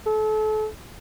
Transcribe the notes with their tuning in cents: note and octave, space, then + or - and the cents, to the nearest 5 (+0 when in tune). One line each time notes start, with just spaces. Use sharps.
A4 -35